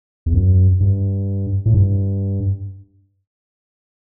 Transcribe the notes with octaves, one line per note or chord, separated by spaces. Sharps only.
E2
F#2
G2
A2
G2